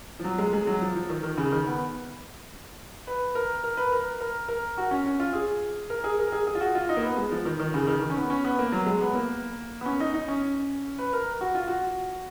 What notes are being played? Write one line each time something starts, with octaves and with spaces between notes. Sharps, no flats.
F3
F#3
G#3
G#3
F#3
F3
F3
D#3
D#3
C#3
D#3
B3
B4
A#4
A#4
B4
A#4
A#4
A#4
F#4
C#4
C#4
F4
G#4
A#4
G#4
A#4
G#4
G#4
F4
F#4
F4
D#4
A#3
B3
G#3
F3
D#3
D#3
C#3
D#3
D#3
C#4
B3
C#4
B3
A#3
F#3
G#3
B3
A#3
B3
C#4
D#4
D#4
C#4
B4
A#4
F#4
F4
F#4